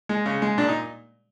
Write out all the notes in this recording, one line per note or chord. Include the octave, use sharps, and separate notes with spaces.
G#3
C#3
G#3
A#2 D4
D#4